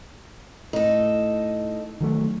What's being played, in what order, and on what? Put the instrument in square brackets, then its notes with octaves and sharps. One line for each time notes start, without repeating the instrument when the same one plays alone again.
[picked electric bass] A2 [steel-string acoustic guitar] D#4 A4
[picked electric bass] D#3 F#3 A3